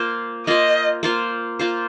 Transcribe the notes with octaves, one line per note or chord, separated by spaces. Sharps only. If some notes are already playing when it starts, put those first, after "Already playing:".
Already playing: A#3 F4 C5
A#3 F4 C5 D#5
A#3 F4 C5
A#3 F4 C5